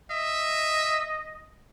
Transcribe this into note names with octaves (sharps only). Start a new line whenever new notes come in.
D#5 E5